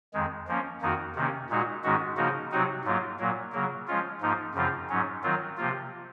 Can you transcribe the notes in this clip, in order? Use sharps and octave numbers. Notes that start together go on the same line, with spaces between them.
F2 D#3 G#3
F3 A#3 C#4
F2 D#3 A#3 D#4 F#4
C3 D#3 A#3 C#4
A#2 G#3 D#4 F#4
G#2 D#3 G#3 C#4 F#4
C#3 F3 A#3 D#4 F#4
C3 F#3 C4 D#4 F#4
G#2 F#3 A#3 F4
A#2 F#3 A#3
C#3 F#3 A#3
F3 G#3 C#4 F4
G#2 F3 A#3 D#4
F#2 C#3 F3 C4 F4
G#2 F#3 C#4
D#3 F#3 C4 F4
C3 F3 A#3 F4